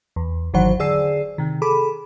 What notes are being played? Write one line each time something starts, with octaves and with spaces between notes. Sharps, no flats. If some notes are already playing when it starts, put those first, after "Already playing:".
E2
G#1 D#3 E3 F#3 C5 F#5
D3 G#4 D5 E6 C7
C3 D#3
G#4 A4 B5 D6